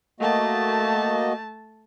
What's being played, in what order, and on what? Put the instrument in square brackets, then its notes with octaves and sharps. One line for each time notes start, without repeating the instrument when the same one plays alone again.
[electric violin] A3 A5 [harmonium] A#3 F#4 D#5